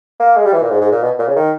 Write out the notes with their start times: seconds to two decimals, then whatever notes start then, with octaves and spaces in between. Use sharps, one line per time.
0.19 A#3
0.36 G#3
0.45 G3
0.52 E3
0.62 A#2
0.70 G#2
0.81 G#2
0.92 A#2
1.03 B2
1.19 A#2
1.27 C#3
1.36 D#3